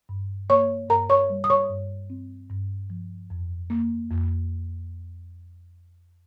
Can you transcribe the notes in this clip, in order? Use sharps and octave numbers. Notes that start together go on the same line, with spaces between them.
G2
A#3 C#5 C#6
G2 A#4 A#5
C#5 C#6
G3
D#6
C#5 C#6
G2
C4
G2
F3
F2
A#3
F2